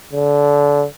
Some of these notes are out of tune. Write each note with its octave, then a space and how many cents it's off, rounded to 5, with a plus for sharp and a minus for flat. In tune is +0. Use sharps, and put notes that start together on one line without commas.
D3 -25